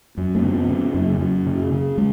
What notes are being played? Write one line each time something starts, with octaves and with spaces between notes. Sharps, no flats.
F#2
A3
C#3 B3
C#3
F#2
F#2
C#3
C#3
G#3